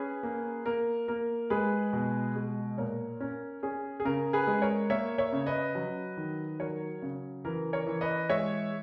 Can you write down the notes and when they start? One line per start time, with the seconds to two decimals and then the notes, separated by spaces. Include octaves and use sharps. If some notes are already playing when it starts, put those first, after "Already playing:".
Already playing: C#4 G#4 B4
0.23 A#3
0.66 A#3 A#4
1.08 A#3 A#4
1.50 G#3 G#4 B4
1.93 B2
2.36 G#3
2.78 A#2 A#4 C#5
3.20 C#4 A#4
3.63 C#4 G#4
4.00 G#4
4.05 C#3 A#4
4.33 G#4 B4
4.47 G#3
4.62 A#4 C#5
4.90 A#3 C#5 E5
5.18 C#5 E5
5.33 C#3
5.46 B4 D#5
5.75 F#3
6.17 D#3
6.60 F#3 A#4 C#5
7.02 C#3
7.45 E3 A#4
7.73 A#4 C#5
7.87 E3
8.01 B4 D#5
8.29 G#3 C#5 E5